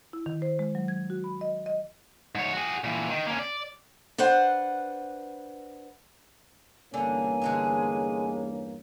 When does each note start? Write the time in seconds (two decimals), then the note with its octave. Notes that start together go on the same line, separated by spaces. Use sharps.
0.13 E4
0.26 D#3
0.42 C5
0.59 G#3
0.75 F#3
0.88 G#6
1.10 F#4
1.24 B5
1.41 D#5
1.66 D#5
2.35 G#2 C#5
2.53 F#4 G#4
2.84 A#2 E3
3.10 D#3
3.26 A#3 C#4
3.39 D5
4.18 D4 B4 C5 F#5
6.94 E2 G2 D3 A#3 C#4 G#5
7.42 D3 G#3 G#4